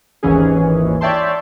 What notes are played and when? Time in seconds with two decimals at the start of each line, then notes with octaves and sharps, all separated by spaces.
0.23 G#1 D#2 G#2 E3 C#4 G#4
1.01 C#5 D5 E5 G5 A5 C6